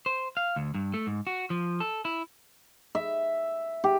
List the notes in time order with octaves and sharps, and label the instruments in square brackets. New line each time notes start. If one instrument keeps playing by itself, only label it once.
[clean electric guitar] C5
F5
D2
G2
A3
G#2
F#4
F3
A4
E4
[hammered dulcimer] E5
G4